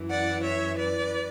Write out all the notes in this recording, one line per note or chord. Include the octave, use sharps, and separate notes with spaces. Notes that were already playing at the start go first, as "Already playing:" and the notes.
Already playing: F#2 E3
D5 F#5
C#5 E5
B4 D5